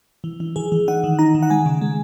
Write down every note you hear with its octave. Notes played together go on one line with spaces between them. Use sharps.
E3
E3
E3 G#4
E3
D#4 F#5
D#3
D#4 A#5
D#3
F#5
G#3 G#5
C#3
G#3